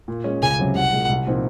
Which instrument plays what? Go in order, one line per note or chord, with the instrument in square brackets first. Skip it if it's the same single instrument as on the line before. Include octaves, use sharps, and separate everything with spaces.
[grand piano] A#2
G#3 C#4
[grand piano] C#2 [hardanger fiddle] G#5
[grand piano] C3 F#3 C#4
[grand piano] C2 [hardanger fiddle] F#5
[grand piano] A#2 G#3
C2
A#2 F3 C4 D#4